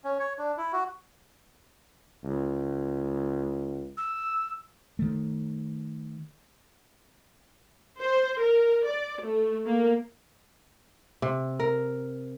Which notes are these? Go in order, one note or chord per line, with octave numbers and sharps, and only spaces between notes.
C#4
C#5
D4
E4
F#4
C#2
E6
D#3 A3
C5
A#4
D5
A3
A#3
C3
A#4